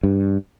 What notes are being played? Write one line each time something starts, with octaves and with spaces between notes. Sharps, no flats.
G2